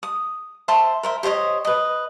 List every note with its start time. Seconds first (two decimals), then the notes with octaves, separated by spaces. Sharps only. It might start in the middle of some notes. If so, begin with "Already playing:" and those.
0.03 D#6
0.68 C5 E5 A5 C6
1.03 A#4 C5 E5
1.23 G4 C5 C#5 D#5
1.65 B4 D#5